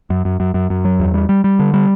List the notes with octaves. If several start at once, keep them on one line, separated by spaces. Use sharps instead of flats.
F#2
F#2
F#2
F#2
F#2
F#3
E2
G3
G3
G3
D3
G3